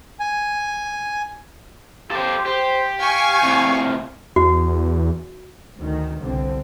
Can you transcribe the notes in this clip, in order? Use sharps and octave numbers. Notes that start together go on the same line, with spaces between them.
G#5
G4 A4 C5
G4 C5
F5 G#5 C#6
A2 C3
E2 F#4
D2 D#3
G1 C2 D3 C4